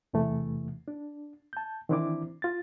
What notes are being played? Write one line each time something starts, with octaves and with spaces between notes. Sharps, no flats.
E2 C3 E3 A3
D4
A5 G6
D#3 E3 C4 D4 E4 D6
F4 A6